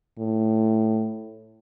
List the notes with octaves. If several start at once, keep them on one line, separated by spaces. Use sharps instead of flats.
A2